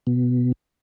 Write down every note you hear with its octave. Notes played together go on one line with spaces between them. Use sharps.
B2